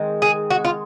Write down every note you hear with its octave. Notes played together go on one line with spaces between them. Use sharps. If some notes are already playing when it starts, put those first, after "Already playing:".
Already playing: D#3 G#3 C4
G#4
F#4
F4